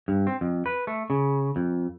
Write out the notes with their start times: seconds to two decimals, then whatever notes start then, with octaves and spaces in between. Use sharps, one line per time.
0.08 G2
0.27 C4
0.41 F2
0.66 B4
0.87 A3
1.10 C#3
1.56 F2